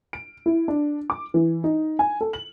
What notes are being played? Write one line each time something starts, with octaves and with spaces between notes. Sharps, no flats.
D7
E4
D4
D6
E3
D#4
G#5
A4
F#7